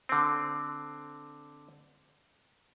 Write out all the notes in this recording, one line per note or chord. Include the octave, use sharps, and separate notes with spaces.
D3 C4